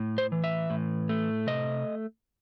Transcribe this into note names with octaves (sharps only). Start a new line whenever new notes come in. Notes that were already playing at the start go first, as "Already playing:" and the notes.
Already playing: A2
C5
E3
E5
A2
A3
C3 D#5